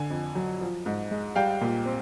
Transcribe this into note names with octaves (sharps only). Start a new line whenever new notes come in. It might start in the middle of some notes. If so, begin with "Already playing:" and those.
Already playing: D3 G#5
F2
F#3
F3
G#2
G#3
G3 F5 G5
A#2
C4